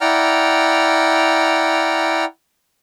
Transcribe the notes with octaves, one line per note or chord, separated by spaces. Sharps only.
E4 D5 F#5 G5 A#5 F6